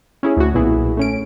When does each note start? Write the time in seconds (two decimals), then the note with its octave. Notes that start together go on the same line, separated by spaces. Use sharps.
0.23 C#4 E4 G#4
0.37 D2 F#4
0.54 B1 A#2 B3 E4 G#4
0.97 A3 C#4 D7